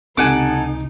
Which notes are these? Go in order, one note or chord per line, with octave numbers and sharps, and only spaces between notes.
C#2 C3 D#4 A4 F#5 G#5 D6